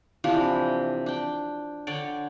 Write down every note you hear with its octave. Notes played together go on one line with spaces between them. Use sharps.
C3 E3 F3 D4
D4 G5
D3 C#5 D5 G5